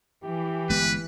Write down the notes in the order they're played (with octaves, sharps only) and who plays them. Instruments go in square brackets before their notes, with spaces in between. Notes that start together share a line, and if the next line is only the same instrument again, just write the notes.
[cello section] E3 [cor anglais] G4
[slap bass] G1 G#3 B3 [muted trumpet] B4